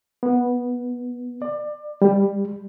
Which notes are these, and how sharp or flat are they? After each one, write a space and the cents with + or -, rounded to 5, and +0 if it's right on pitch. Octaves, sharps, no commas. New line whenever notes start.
B3 -10
D5 +25
G3 +15